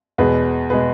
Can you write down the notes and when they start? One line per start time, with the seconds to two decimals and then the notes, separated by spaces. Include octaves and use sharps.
0.18 E2 B2 G#3 G#4 B4
0.70 B2 G#3 G#4 B4